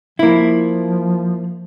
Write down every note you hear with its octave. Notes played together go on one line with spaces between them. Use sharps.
F3 A#3 E4